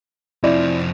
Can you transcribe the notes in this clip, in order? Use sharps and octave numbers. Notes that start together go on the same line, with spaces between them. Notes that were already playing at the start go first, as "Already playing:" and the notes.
F2 C3 E4 D5